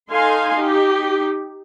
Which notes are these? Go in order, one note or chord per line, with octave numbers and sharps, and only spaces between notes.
D#4 A4 F5 G#5 C6
D#4 G4